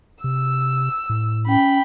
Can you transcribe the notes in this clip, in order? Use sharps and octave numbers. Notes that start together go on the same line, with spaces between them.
C3 E6
A2
C#4 G5 B5